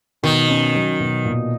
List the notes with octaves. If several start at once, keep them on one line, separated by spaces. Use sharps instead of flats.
B2 D#3
C#4
F#3
B2
A#2